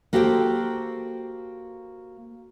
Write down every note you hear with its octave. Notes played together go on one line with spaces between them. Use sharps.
A#3 F#4 G4 A4 C5 G5